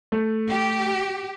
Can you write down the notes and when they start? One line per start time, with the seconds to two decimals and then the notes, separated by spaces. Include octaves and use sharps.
0.12 A3
0.49 G4